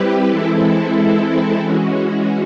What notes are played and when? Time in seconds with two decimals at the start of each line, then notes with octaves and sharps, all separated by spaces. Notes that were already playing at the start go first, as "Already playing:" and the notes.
Already playing: G3 C4 E4 G4 B4
0.29 E3 G#3 C4 E4 A4
1.61 E3 G#3 C#4 F#4